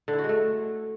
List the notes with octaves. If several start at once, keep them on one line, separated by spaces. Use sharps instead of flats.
D3
E4
F#4
G#3
A3